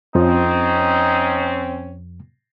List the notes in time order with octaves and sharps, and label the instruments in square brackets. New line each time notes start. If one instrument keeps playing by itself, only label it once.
[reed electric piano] F2 F3 [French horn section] C4 C#4 [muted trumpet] D#4